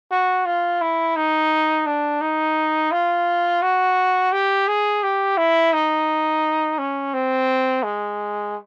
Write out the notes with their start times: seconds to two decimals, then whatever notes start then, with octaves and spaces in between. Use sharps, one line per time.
0.11 F#4
0.46 F4
0.81 E4
1.16 D#4
1.86 D4
2.21 D#4
2.92 F4
3.62 F#4
4.33 G4
4.68 G#4
5.03 G4
5.38 E4
5.73 D#4
6.79 C#4
7.14 C4
7.83 G#3